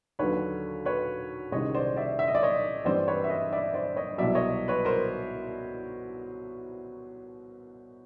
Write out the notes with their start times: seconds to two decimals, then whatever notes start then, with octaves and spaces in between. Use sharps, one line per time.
0.19 D#2 D3 F#3 B4 C#5
0.86 B4 C#5
1.52 C2 C3 D#3 G#3 C#4 C#5 D#5
1.75 C5 D5
1.97 D5 E5
2.19 E5
2.28 D#5
2.35 D5
2.43 C#5 D#5
2.85 G2 E3 G3 C4 C5 D5
3.08 B4 C#5
3.24 E5
3.30 C#5 D#5
3.52 D5 E5
3.74 C5 D5
3.96 C#5 D#5
4.18 C2 B2 F#3 D5 E5
4.35 C#5 D#5
4.68 B4 C#5
4.85 A#4 C5